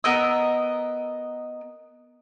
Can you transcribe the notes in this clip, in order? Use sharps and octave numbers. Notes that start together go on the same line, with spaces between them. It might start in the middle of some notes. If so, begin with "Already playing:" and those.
B3 A#4 D#5 E6